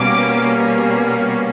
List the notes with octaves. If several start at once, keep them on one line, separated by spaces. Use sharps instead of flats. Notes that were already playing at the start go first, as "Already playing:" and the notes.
Already playing: B2 G3 A#3 C#4 D6